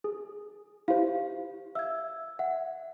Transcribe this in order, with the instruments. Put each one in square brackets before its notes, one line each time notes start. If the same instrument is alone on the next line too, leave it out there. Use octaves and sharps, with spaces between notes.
[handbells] G#4
[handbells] E4 F4 C5 [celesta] G4 F5
[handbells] E5 F5 [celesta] E6 G#6
[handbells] E5 [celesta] F#5